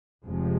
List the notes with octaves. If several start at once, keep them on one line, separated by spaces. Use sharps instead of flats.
F1 F2 C3 F3 G#3